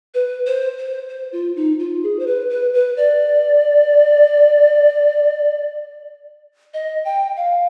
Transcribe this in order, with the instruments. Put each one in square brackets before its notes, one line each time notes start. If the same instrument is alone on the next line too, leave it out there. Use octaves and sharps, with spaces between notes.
[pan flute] B4
C5
C5
C5
F4
D#4
F4
G#4
C5
B4
B4
B4
D5
D#5
G5
F5